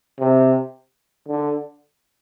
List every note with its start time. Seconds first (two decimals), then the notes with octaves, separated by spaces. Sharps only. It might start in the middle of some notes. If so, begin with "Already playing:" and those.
0.20 C3
1.28 D3